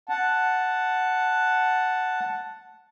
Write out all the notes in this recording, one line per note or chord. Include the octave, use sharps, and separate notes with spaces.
F#5 A5